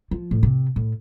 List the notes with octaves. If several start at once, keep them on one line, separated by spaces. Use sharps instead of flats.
F3
A2
C3
A2